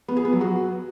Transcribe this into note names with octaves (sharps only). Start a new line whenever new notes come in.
B3
G#4
B3
F#3
F#4